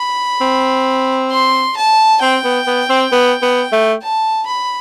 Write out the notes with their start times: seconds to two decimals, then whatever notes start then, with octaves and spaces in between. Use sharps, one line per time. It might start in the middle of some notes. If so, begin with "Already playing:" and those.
Already playing: B5
0.41 C4
1.31 C6
1.76 A5
2.22 C4 G5
2.44 B3
2.67 B3
2.89 C4
3.12 B3
3.42 B3
3.72 A3
4.02 A5
4.46 B5